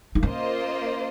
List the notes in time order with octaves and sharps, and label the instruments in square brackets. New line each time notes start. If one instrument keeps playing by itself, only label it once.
[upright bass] D#4
[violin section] A#3 F4 C5 D#5 [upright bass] C#4